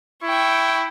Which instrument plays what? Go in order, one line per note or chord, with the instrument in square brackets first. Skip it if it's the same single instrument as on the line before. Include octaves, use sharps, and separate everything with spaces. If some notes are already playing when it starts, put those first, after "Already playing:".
[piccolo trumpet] E4 [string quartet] G5 C#6